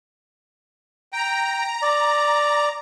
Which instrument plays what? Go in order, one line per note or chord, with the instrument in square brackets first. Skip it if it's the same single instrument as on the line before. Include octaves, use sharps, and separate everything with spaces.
[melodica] G5 [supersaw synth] A#5
[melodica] D5